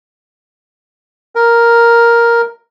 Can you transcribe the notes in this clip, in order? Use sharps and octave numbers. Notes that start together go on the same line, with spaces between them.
A#4